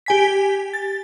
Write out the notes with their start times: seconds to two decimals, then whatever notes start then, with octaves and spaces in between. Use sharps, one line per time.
0.06 G4 G#5 B6
0.73 A6